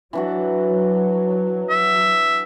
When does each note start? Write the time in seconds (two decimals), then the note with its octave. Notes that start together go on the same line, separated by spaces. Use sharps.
0.13 E3 F#3 D4 F#4
1.69 E5